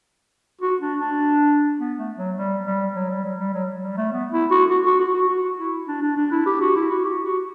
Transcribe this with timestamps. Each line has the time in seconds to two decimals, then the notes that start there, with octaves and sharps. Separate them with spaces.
0.61 F#4
0.81 D4
1.00 D4
1.79 B3
1.98 A3
2.17 F#3
2.37 G3
2.66 G3
2.95 F#3
3.10 G3
3.24 F#3
3.39 G3
3.54 F#3
3.83 G3
3.97 A3
4.13 B3
4.32 E4
4.51 F#4
4.70 F#4
4.86 F#4
5.00 F#4
5.14 F#4
5.29 F#4
5.59 E4
5.88 D4
6.03 D4
6.17 D4
6.32 E4
6.46 G4
6.61 F#4
6.76 E4
6.90 F#4
7.05 G4
7.24 F#4